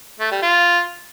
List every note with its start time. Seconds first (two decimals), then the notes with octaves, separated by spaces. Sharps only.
0.20 A3
0.31 G3
0.42 F4